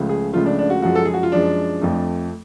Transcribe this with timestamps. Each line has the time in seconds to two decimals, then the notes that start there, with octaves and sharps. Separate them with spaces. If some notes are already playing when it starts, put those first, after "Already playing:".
Already playing: C#2 C#3 F3 A3
0.09 G#4
0.34 C#2 C#3 F3 A3 F4
0.46 D4
0.59 D4
0.70 F#4
0.82 F#2 F3 G#3 F#4
0.95 A4
1.05 G#4
1.14 F#4
1.23 F4
1.32 F#2 F3 G#3 D4
1.81 F2 F3 A3